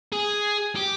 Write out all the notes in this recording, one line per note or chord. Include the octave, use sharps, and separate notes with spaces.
G#4
G4